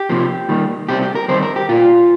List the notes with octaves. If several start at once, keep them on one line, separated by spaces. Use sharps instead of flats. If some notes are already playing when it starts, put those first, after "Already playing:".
Already playing: G4
C3 F3 A#3
D#3 G3 A#3
C3 G3 C4 G4
G4
A#4
D#3 G3 C4 C5
A#4
G4
A#2 A#3 F4